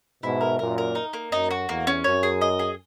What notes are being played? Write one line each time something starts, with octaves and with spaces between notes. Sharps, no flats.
G#2 B2 E4
A#4
F#2 A#2 A#4
A#4
D#4
A#3
F#2 D#4
F#4
E2 A#3
C#4
F#2 C#5
G#4
D#5
G#4